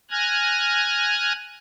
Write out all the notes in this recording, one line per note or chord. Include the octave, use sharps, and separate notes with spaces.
G#5 F6 F#6 G#6 A#6